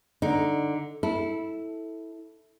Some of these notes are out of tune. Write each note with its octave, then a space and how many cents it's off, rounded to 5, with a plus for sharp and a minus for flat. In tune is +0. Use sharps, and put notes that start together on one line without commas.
D3 +0 D#4 +0
E4 -15 A4 +0